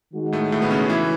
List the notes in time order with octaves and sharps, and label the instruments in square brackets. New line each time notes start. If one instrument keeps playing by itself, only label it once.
[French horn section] D#3 G#3 D#4 F#4
[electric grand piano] A2 A3
A2 A3
B2 B3
C#3 C#4
E3 E4